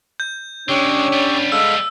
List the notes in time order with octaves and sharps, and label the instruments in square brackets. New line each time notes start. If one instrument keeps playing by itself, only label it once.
[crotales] G6
[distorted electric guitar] D3 G#3 [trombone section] C#4 D4 [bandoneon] G4 C#5 E6
[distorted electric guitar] G3 B3
[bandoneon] G#3 A4 F5 [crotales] E6